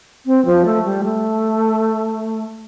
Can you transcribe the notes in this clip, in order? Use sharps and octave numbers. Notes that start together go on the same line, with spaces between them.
C4
F3
A3
G3
A3